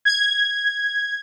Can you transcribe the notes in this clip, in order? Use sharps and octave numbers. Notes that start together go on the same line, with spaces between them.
G#6